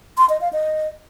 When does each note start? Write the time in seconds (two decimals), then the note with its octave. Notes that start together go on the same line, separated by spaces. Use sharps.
0.18 C6
0.29 D#5
0.41 F5
0.53 D#5